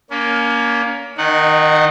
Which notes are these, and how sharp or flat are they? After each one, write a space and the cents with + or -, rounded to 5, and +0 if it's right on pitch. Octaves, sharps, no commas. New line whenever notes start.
A#3 +10 C#4 +35
D#3 +0 D#4 -30 F#5 -5